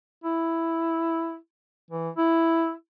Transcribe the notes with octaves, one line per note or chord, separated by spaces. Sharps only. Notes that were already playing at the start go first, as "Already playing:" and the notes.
E4
E3
E4